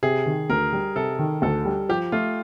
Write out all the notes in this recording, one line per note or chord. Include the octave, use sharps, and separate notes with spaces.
C3 G#4
D#3
D2 A#4
G3
C3 A4
D#3
D2 A4
G3
F3 G4
A3 F4